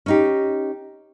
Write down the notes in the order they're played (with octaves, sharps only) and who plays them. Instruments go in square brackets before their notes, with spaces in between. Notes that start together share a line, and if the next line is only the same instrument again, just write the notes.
[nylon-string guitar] C#4 D#4 G4